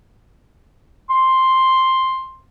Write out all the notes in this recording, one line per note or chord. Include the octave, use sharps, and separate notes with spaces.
C6